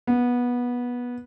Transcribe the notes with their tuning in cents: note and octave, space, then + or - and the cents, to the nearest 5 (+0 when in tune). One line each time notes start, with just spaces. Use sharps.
B3 -15